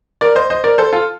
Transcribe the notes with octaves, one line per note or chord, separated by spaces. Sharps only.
A#4 D5
C5 D#5
C5 D#5
A#4 D5
A4 C5
F4 A4